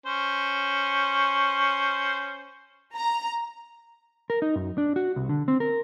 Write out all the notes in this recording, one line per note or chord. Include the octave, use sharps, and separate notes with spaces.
C#4 C5
A#5
A#4
D#4
F#2
D4
F#4
C2
D3
C4
A#4